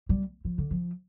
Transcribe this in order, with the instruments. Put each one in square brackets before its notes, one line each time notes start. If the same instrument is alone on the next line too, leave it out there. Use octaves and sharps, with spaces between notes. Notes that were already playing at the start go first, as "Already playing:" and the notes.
[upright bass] G3
F3
D3
F3